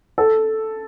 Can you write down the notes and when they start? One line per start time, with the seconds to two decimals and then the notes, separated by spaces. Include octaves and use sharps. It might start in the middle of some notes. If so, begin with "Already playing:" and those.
0.18 A4